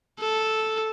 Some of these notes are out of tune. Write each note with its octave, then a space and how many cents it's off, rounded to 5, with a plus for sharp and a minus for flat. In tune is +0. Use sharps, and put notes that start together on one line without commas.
A4 -5